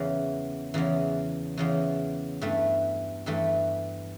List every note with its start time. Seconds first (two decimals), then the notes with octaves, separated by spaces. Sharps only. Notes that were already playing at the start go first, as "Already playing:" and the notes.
Already playing: E2 C#3 E3
0.74 E2 C#3 E3
1.57 E2 C#3 E3
2.41 G2 E3 A3
3.26 G2 E3 A3